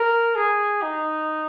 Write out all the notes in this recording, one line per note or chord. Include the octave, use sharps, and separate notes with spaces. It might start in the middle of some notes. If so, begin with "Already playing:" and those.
Already playing: A#4
G#4
D#4